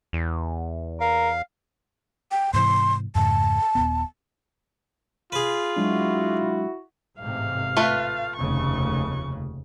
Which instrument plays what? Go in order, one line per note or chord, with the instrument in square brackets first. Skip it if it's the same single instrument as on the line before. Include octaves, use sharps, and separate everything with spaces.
[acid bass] E2
[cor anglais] A#4 [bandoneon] F5
[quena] G5
[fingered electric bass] G#2 C3 E3 [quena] C6
[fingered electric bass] F2 G#2 C#3 [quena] A5
[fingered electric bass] D#1 F2 B3
[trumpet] F4 [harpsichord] G#4 B4
[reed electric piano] F#3 G#3 D4 [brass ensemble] E4 F#4
[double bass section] A1 G#2 C3 [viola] F5
[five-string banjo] A3 F4 B4
[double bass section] F1 D#2 C#3 [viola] C#6